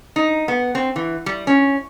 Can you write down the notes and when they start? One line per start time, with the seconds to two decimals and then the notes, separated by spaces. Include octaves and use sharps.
0.16 D#4
0.48 B3
0.75 C4
0.96 E3
1.26 G3
1.47 C#4